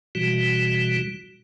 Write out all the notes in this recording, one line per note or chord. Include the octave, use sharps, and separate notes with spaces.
B2 E3 G3 F#4